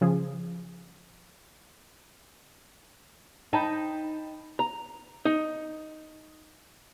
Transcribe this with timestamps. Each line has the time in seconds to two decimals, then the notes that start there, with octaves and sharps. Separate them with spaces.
0.01 C#3 F3 G#4
3.53 D#4 G5 A5 B5
4.59 A#5
5.25 D#4